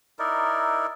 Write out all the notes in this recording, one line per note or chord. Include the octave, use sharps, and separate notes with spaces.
D#4 E4 A#4 D5